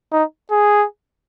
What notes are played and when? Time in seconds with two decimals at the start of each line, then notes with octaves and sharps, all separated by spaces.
0.12 D#4
0.51 G#4